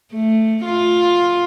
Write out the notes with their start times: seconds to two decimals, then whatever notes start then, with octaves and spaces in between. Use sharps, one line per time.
0.13 A3
0.65 F4